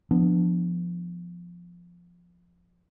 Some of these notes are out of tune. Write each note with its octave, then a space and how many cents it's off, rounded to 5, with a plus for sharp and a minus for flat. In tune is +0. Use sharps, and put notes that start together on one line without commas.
F3 +0 B3 +0 D4 +0